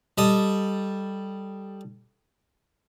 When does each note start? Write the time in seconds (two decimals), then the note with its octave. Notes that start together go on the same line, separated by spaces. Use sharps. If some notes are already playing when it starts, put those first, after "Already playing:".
0.18 G3 A4 D#5